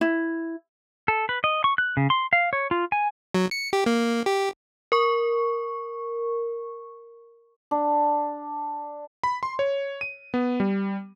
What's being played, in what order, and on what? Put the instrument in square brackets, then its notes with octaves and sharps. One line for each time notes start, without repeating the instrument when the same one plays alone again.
[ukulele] E4
[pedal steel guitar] A4
B4
D#5
C#6
F#6
C#3
C6
F5
C#5
F4
G#5
[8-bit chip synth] F#3
C#7
G4
A#3
G4
[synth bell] A#4 C#6
[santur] D4
[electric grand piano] B5
C6
C#5
D#7
B3
G3